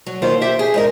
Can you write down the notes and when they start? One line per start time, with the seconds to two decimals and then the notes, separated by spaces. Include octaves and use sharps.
0.06 F#3
0.22 D#2 D#3 F4 C5
0.41 G4 C5 E5
0.59 G#4
0.74 G#2 D#4 A#4